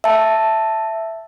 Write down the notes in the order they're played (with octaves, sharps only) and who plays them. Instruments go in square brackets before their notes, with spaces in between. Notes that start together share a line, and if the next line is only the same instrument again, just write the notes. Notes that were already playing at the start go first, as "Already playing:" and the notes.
[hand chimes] E5 A5